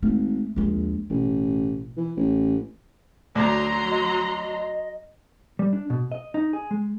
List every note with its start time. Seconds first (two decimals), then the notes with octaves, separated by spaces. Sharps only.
0.02 G#1 G#3 A3
0.56 A#1 D#2 G#3
1.10 A1 B2
1.97 E3
2.16 A1
3.35 D2 F#3 A#5 C6
3.91 D#5
5.59 G3
5.73 D4
5.90 B2
6.12 D#5
6.34 D#4
6.53 G#4
6.71 G#3